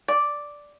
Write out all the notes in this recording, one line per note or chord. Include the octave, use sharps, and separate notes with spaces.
D5